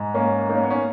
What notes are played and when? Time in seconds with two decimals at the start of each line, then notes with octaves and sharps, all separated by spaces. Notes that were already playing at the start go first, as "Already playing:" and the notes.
Already playing: G#2
0.14 A#3 C#4
0.49 A#3 D#4
0.56 C#4
0.63 B3
0.70 C#4